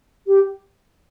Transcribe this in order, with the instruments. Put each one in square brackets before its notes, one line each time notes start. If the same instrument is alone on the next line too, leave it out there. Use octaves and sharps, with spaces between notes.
[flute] G4